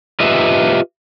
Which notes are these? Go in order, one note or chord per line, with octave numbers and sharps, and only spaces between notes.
F4 G4 B4 D#5 E5